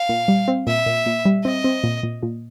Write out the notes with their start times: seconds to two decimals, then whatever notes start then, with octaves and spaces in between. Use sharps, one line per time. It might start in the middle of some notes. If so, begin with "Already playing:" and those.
Already playing: F5
0.09 A#2
0.28 G3
0.48 C4
0.67 A#2 E5
0.86 A#2
1.06 A#2
1.25 G3
1.45 C4 D#5
1.64 C4
1.84 A#2
2.03 A#2
2.23 A#2